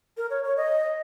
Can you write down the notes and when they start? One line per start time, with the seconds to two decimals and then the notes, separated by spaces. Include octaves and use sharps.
0.17 A#4
0.30 C#5
0.44 C#5
0.57 D#5